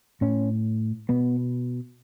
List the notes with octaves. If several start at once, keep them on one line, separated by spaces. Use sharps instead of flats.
A2 C#4
B2 B3